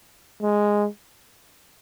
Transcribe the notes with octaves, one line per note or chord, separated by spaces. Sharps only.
G#3